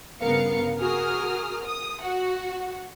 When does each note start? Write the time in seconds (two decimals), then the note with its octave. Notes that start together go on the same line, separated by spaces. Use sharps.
0.22 G2 C#3 B3 A#4 F5 C#7
0.80 F#4 G#4 A#4 D#6 F6
1.64 D#6
2.02 F#4 F#5